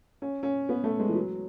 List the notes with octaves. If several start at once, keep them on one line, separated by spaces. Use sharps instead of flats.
C#4
C#4
B3
A3
G#3
E3
F#3